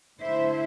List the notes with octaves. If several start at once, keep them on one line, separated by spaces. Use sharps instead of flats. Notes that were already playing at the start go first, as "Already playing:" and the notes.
D3 A3 E4 C5 E5